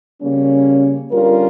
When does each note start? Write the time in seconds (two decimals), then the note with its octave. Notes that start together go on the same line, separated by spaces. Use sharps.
0.21 C#3 G3 A#3 C#4
1.11 D3 G3 C#4 F4 A#4